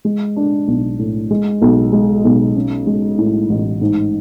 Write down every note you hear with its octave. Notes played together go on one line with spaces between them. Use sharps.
G#3
D4
B1
A2
G#3
B1
G#3
B1
C#4
G#3
A2
A1
G#2